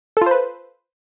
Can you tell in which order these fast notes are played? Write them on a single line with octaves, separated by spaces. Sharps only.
A4 F4 C5 B4